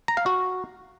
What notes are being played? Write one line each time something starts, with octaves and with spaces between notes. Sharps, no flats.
A#5
F5
F#4